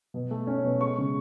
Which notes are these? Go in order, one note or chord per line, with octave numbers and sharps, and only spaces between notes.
B2
A3
C#4
B2
G#3 C#6
C#3